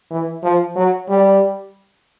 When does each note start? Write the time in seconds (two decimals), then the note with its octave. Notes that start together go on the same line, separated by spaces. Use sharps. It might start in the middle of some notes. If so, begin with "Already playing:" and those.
0.11 E3
0.43 F3
0.76 F#3
1.09 G3